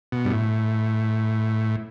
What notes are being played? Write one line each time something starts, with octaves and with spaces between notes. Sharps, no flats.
B2
G2
A2